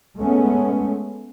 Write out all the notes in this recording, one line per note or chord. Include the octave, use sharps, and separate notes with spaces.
G#3 A3 B3 C#4